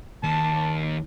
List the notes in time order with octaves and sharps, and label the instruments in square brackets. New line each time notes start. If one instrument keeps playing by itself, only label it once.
[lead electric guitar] D#2 [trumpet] A5